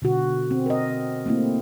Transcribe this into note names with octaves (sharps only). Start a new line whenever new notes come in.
B2 D3 F#4
C4
A#4 D#5
A3 A#3 C4 E4